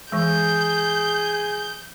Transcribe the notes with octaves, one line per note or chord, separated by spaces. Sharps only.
E3 G#3 G#4 G6